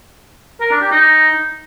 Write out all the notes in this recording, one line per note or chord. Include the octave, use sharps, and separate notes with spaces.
A#4
D4
G4
D#4